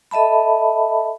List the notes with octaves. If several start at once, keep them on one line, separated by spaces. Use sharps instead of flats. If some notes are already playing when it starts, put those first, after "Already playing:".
A4 D#5 E5 A5 B5